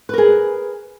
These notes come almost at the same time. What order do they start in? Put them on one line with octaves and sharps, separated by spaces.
B4 A#4 G#4